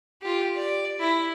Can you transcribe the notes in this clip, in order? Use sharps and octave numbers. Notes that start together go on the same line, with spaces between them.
F4 G4
D5
E4 E5